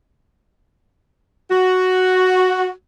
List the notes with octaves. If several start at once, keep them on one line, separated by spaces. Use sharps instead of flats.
F#4